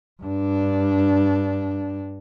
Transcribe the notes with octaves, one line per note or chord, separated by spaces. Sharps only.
G2 D4